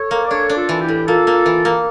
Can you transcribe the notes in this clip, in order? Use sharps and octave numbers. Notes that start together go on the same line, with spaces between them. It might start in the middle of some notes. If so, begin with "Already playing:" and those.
Already playing: A4 C#5
A#3
D5
D4 A4 C#5
D4
F4 A4
E3
E4 G4
A2
A#3 F4 A4
A#3
E3
A#3